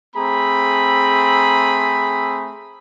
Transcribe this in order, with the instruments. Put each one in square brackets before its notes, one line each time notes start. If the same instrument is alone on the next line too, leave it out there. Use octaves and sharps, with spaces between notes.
[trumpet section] A3 C4 G#4 A#5 B5